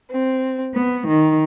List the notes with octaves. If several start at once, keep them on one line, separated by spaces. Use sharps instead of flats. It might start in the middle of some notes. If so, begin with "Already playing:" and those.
C4
B3
D#3